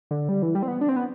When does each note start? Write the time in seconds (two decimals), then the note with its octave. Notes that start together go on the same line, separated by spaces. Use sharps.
0.11 D3
0.29 G3
0.42 E3
0.55 G3
0.63 C4
0.68 B3
0.81 D4
0.89 C4
0.96 B3